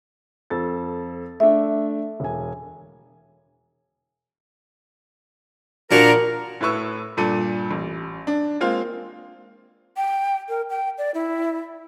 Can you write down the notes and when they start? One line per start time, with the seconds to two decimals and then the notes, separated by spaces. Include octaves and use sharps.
0.50 F2 A4 A6
1.40 A3 D4 E5
2.20 E1 G#5
5.91 A#2 F3 D4 F#4 A#4
6.61 A2 E4 B4 C#6 E6
7.17 G2 A#2 A4 D#7
7.71 A1
8.27 D4
8.60 G#3 A#3 C4 F4 F5
9.97 G5
10.49 A#4
10.70 G5
10.98 D5
11.14 E4